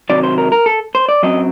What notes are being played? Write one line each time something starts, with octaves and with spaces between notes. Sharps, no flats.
C3 D#3 F#3 D5
C5
A#4
A#4
A4
C5
D5
F#2 F#3 C4 D#5